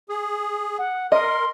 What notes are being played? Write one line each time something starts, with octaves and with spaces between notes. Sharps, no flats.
G#4
F#5
A#4 D#5 C6